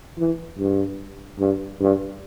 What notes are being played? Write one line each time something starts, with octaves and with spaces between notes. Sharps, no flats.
E3
G2
G2
G2